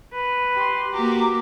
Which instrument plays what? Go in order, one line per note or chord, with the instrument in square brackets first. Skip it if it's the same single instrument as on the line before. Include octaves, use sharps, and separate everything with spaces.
[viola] B4
[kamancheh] G4 C6
[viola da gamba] A#3 F#4 G4 [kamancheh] A#5 D6